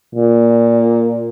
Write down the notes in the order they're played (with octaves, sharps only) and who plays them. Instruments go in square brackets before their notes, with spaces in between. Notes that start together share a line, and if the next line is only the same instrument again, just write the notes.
[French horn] A#2